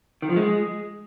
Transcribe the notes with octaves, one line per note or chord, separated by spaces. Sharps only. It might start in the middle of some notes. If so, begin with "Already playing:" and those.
D#3
F3
G#3